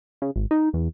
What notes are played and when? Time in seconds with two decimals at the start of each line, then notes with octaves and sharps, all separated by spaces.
0.22 C#3
0.36 G#1
0.51 D#4
0.73 E2